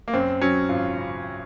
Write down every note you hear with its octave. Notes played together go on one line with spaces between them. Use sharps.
A#3
F#2 C4
F#3 C#4
G#1 F4
C#3